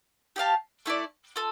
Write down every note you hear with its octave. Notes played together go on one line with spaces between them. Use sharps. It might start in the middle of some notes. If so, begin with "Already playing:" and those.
G4 D5 F5 A5
A3 E4 A4 D5
F4 A4